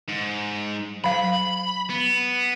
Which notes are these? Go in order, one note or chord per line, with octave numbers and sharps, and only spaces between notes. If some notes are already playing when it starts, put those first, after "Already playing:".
G#2
F#3 F5 B5
B3